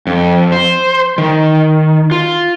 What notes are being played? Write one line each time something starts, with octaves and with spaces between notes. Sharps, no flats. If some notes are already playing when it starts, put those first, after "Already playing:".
F2
C5
D#3
F4